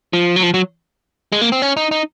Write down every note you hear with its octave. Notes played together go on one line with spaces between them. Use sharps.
F3
F#3
F3
F#3
G#3
A#3
C4
C#4
D#4
D#4